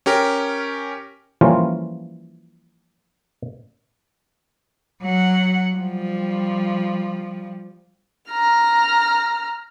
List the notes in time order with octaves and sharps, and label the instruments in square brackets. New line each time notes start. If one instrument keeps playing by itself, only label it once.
[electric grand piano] C#4 G4 A#4
[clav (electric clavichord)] E3 F3 G3 A#3 C#4 F4
[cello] F#3 F#5
F3 G3
[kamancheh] A#5 F6